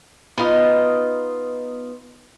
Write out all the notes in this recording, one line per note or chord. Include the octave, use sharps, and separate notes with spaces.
B3 D#4 F4 D#5